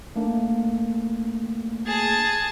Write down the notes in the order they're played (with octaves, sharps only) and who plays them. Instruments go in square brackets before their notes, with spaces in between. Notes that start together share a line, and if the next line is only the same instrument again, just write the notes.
[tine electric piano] A3 A#3 D4
[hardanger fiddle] G#4 A5